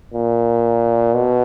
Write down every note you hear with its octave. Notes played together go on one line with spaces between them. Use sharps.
A#2
B2